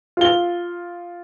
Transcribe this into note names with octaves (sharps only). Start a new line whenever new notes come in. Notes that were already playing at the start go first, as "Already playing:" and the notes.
F4 G7